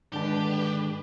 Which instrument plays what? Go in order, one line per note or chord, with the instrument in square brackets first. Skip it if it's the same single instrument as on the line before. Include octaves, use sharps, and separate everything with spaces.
[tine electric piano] G#2 D#3 G#3 [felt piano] D3 A5 [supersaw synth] D4 B4 [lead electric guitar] G4